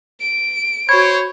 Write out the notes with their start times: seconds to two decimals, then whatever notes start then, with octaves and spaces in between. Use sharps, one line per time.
0.21 D7
0.89 F#4 C5 C#5 B5 G#6